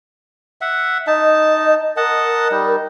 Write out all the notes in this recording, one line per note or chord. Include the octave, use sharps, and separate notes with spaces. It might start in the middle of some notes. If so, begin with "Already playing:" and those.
E5 F#5
D#4 D#5 A5
A#4 D#5 F#5 A5
G3 D#4